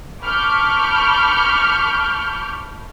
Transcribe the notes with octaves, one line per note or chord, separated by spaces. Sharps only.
A5 B5 C#6 D6 F6 G6